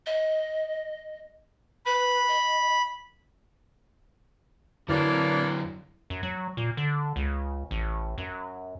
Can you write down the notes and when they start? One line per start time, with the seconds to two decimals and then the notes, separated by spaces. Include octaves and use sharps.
0.06 D#5
1.86 B4 B5
2.28 D#5
4.89 F#2 D3 E3 F#3 A#3 D4 E4
6.10 F#2
6.23 F#3
6.57 A#2
6.77 D3
7.16 C#2
7.71 A1
8.18 F#2